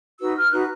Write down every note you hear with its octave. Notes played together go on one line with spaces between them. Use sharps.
D#4 F#4 B4 E6
F6
D#4 F#4 B4 F#6